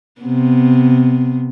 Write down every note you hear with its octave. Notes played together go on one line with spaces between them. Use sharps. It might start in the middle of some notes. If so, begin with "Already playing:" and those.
C3 B3